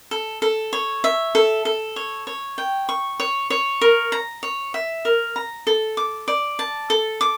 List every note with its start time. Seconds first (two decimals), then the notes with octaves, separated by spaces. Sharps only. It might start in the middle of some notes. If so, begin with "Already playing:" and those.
0.11 A4
0.42 A4
0.73 C#5
1.04 E5
1.35 A4
1.65 A4
1.96 C#5
2.27 C#5
2.58 G5
2.89 C#6
3.20 C#5
3.50 C#5
3.81 A#4
4.12 A#5
4.43 C#5
4.74 E5
5.05 A#4
5.36 A#5
5.67 A4
5.97 D6
6.28 D5
6.59 A5
6.90 A4
7.21 D6